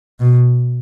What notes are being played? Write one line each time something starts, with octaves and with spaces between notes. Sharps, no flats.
B2